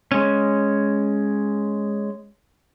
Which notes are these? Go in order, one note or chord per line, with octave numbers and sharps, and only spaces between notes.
G#3 C#4